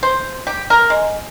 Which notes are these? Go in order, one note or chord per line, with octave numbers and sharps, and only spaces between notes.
C5
G4
A#4
G#3